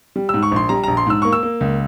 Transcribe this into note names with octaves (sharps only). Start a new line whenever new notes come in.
G3
G#2 E6
C#6
A#1 C6
G3 A#5
A#1 A#5
C6
G#2 E6
A#3 C#6
E6
A#3
C#2